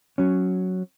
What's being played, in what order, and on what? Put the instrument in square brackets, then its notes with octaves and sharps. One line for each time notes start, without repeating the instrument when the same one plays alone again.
[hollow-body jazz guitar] F#3 C#4